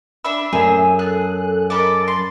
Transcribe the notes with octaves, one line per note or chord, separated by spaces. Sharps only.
D4 E5 B5 E6
F#2 A3 G#4 E5
G#4 A4 F#6
A4 A#4 D#5 B5 D6 A6
C6